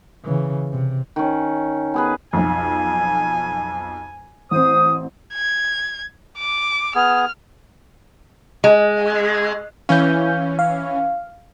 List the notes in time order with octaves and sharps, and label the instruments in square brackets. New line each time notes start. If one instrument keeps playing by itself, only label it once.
[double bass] C#3 E3
C3
[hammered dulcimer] D#3 C#4
B3 G#4 B4
[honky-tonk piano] B1 F2 [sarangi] G#5
[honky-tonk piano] A1 C4 [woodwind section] C5 D#6
[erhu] G#6
D6
[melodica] B3 G#4 [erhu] F6
[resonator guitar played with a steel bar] G#3
[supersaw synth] E3 C#4 [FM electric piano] F5 G6
[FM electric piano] F5